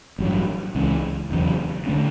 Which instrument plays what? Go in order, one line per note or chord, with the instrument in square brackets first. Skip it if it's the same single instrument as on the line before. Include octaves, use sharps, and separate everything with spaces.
[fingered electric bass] A1 G2 F#3
C#2 C#3 E3
E1 E2 C#3 F#3
D3 A3 C#4